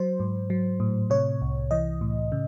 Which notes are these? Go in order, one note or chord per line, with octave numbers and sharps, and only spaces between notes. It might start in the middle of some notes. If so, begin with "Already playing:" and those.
Already playing: F#3 C5
G#2
F#3
A2
C3 C#5
C2
E3 D#5
A2
C#3